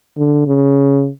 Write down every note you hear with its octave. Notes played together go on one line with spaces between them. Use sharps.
D3
C#3